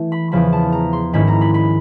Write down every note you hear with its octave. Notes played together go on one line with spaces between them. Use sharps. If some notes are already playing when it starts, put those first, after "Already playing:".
Already playing: E3 A3
B5
E2 C#3 F3 B5
A5
A#5
C6
G#2 D#3 G#3 C#4 E4 B5
A#5
B5
B5